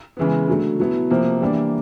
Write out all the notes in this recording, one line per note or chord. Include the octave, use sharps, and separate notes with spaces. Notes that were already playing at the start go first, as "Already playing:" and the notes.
C#3 E3 G#3 B3
D3 F#3 A3
B2 F#3 B3 E4
C3 F3 A#3
E3 G3 A#3 D4